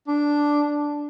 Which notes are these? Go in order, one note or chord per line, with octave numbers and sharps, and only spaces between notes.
D4